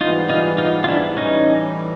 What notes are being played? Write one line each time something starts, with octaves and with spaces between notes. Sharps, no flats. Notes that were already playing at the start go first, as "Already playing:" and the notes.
G#2 E3 G3 B3 D#4 F4
D#4 F4
D#4 F4
F4
D4 E4
A2 E3 G3 C#4 D#4